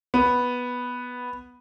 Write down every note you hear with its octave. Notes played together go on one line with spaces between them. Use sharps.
B3